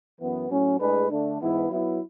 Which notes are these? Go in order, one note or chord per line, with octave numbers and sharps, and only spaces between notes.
F#2 E3 B3
A2 F#3 C#4
A2 G#3 D4 G#4 B4
D3 A3 D4
G#2 E3 B3 E4
F#3 B3 E4